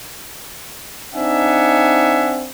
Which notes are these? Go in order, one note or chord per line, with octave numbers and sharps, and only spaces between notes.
C4 D4 D#4 E5 F#5 G#5